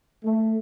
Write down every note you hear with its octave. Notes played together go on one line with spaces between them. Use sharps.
A3